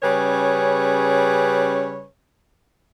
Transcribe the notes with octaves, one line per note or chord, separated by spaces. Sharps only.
C#3 G3 C#4 G#4 B4 C#5